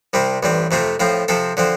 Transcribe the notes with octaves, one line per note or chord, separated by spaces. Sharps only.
C2 C3 G3 C4
A1 G2 G3 C4
F2 C3 A3 C4 F4
A2 F3 C4 F4
C3 F3 C4 A4
D3 F3 C4